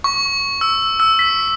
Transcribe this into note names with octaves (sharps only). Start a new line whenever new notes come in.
C#6
E6
E6
B6